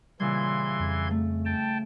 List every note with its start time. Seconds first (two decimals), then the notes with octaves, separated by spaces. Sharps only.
0.20 A#2 C#3 E3 G3 C6 G#6
0.79 F2
1.11 A3
1.45 G5 A5